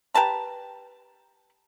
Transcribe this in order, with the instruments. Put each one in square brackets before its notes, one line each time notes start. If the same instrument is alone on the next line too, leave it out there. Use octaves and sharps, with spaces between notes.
[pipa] G4 B4 A5 A#5